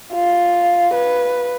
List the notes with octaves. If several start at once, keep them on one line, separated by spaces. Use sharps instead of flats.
F4
B4